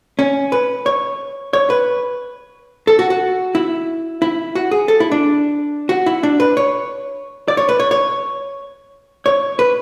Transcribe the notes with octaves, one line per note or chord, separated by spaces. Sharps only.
C#4
B4
C#5
C#5
B4
A4
F#4
F#4
E4
E4
F#4
G#4
A4
E4
D4
F#4
E4
D4
B4
C#5
D5
C#5
B4
C#5
C#5
C#5
B4